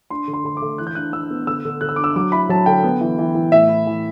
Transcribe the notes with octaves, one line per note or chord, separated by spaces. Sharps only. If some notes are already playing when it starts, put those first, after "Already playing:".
D4 C6
D3
C6
D3 C6
D6
A3
E3 F#6
G6
D4 F#6
D4 E6
B3
D3 E6
D3
D3 F#6
E6
D4 D6
E6
F#3 D6
E4 B5
F#3 A5
D3 G5
B3
E3
E3
E3
A2 E5
E4
E3